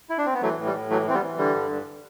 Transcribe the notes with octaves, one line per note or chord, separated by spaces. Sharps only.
E4
D4
C4
B3
E3 F#3 A3
A2
G3
A2
E3 F#3 A3
E3 C4
G3 B3
E3
D3 G3
G2
G2